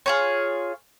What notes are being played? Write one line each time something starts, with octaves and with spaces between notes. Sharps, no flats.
F4 G#4 C#5